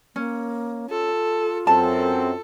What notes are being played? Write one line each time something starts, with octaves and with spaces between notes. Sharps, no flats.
A#3 C#4
F4 A4
F#2 C4 A4 A5